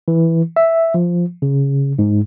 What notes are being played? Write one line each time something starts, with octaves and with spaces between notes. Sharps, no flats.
E3
E5
F3
C#3
G#2